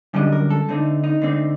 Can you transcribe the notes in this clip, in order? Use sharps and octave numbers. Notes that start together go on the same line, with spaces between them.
F#2 D3 G3 D4 D#5
A#4
A4
D3 A3 C4 D#4
D#4
D3 A3 C4 D#4